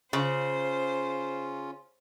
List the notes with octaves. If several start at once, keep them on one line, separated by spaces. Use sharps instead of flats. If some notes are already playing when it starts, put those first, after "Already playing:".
C#3 C#4 F4 C5